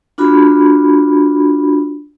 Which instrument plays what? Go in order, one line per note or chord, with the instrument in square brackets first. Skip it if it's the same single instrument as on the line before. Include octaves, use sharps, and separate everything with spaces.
[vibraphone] D4 F4 F#4 B5